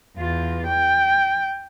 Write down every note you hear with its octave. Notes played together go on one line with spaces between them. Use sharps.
E2 F4
G5